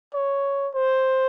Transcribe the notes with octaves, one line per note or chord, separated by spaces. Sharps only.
C#5
C5